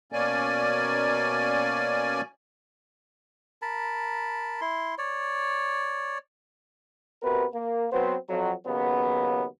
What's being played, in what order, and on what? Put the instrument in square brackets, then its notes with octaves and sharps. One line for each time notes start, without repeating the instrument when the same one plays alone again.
[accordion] B2 A#3 C#4 D5 G#5
[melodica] A#4 A5 B5
E4 C6
C#5 D5
[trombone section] C3 B3 F#4 A#4 B4
A#3
F#3 B3 C4 B4 C5
F2 F#3
D#2 C#3 F#3 B3